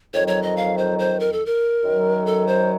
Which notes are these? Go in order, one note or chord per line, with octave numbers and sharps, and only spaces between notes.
F2 D#3 F#3 C#5
C#5
D#5
F5
C5
C5
A#4
A4
A#4
F#2 D#3 F#3
A4
C5